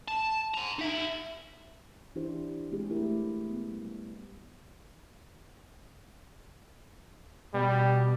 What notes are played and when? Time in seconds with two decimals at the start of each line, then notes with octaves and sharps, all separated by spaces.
0.08 A5
0.54 G#5 A#5
0.79 D#4 E5
2.15 E3 D4 E4 G4 C5
2.72 G#3 C4 G4 G#4
2.90 A3 E4 A#4
3.50 B3
3.72 G3
7.54 B2 G3